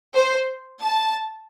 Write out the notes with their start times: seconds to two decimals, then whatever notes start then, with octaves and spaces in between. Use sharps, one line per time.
0.14 C5
0.82 A5